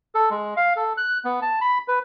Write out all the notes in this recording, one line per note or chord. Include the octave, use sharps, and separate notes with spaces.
A4
G#3
F5
A4
F#6
B3
A5
B5
B4